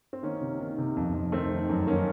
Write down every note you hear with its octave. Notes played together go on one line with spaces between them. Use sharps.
C4
D#3 A#3 C#4
C3
D#3
C3
F2
F2
D#3 A3 C4
D#3
F#2
D#3 A#3 C#4